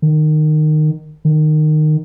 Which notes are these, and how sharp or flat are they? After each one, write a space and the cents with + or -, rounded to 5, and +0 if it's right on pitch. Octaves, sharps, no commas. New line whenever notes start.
D#3 -20
D#3 -20